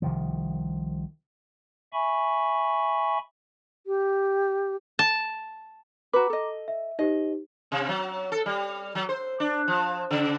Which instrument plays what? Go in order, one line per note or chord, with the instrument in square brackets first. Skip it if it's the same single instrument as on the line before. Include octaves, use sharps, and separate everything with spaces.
[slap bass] C2 D#3 F3
[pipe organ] E5 G#5 B5 C#6
[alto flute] G4
[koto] A5
[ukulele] F#4 B4 [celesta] A#5 D6
[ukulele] A4 D#5
[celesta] E5
[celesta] D#4 G4 C5 [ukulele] D#5
[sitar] C3
F#3
A4
G3
F#3
C5
D4
F3
C#3